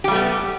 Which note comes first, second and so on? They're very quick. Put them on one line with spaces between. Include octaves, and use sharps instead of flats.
G4 G3 A3 B3